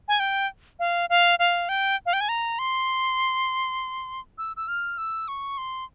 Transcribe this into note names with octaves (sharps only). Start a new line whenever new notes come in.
G#5
G5
F5
F5
F5
G5
F5
G5
G#5
A#5
C6
E6
E6
F6
E6
C#6
C6